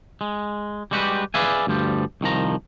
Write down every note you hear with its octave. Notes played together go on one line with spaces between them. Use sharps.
G#3
G3 G#3 F#4 G4 A#4 B4
G#4 B4 D5 E5 F5 G#5
D2 G2 F3 G3
C2 D#3 F3 A#5